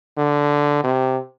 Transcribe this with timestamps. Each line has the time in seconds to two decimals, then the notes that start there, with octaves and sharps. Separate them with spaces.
0.17 D3
0.84 C3